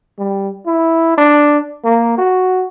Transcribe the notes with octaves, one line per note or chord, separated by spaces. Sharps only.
G3
E4
D4
A#3
F#4